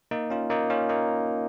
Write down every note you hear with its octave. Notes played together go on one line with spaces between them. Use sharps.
A#3 D#4
C#4 F4
A#3 D#4
C#4 F4
A#3 D#4